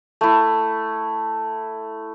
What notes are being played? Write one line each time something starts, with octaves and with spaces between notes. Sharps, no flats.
A3 E4